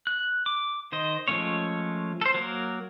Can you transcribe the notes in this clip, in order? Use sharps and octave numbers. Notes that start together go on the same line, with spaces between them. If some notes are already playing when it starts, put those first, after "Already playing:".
F#6
D6
D#3 C5 D#5
F3 G#3 A3 C#4 C#5
A4 C5
F#3 A#3 A#4